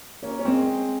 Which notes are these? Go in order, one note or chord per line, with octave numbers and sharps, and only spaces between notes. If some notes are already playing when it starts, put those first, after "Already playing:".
A#3 C#4
C#4
G#3 C4